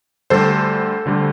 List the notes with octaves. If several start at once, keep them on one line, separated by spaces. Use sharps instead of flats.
D2 D3 G3 A4 C5
D2 D3 G3